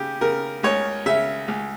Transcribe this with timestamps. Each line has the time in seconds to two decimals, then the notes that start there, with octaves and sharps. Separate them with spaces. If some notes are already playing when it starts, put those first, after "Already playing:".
Already playing: C#3 G4
0.21 C#3 A#4
0.63 C#2 C#5
1.06 C#3 E5
1.48 C#2